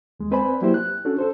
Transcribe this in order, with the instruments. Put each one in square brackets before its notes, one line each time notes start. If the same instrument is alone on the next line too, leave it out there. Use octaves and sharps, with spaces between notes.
[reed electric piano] D#2 G#3
C4 B4 C5 D5 G#5 B5
F#3 A#3 E4 G4 C5
F#6
C#4 D4 F#4 A4
A4 C5